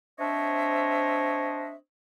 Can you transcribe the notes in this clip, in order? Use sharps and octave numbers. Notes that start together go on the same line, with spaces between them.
C4 D4 C5 C#5 D#5 E5